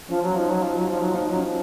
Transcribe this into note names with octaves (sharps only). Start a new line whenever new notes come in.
F3 C#4
F#3
F3 D#4
F#3
F3 F4
F#3
F3
D#4
F#3
F3 D#4
F#3
C#4
F3